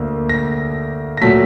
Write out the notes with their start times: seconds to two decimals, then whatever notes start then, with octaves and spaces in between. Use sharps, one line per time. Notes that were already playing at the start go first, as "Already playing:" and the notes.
Already playing: D2 D3 A#3
0.29 A#6
1.17 A#6
1.21 A#2 F#3 A3 B6